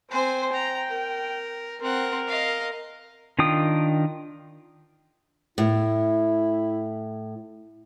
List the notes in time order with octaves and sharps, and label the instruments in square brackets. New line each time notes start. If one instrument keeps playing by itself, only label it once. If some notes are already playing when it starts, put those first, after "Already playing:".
[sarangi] C4 [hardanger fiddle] C5 G#5
[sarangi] G5 [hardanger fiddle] A#5
[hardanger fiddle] A#4
[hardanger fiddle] C4 F#5 [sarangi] A#4
[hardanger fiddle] D#5 F5
[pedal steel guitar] D#3 D4 F4 G5 D#6
[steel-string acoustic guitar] A2 [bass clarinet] E4